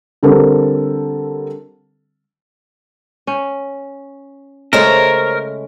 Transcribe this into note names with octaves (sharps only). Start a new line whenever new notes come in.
D3 G3 C4 A4 A#4
C#4
C#3 G#3 A3 A#4 C5 C#5 E5